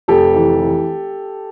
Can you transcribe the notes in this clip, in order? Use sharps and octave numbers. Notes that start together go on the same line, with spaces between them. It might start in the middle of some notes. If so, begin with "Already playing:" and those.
F1 G4 A4
E3
E3